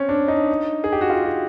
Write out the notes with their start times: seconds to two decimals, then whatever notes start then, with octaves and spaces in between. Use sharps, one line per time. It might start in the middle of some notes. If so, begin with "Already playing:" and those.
Already playing: C4 C#4
0.09 D4
0.28 D#4
0.84 G#4
0.92 G4
1.01 F#4
1.10 F4
1.26 F#4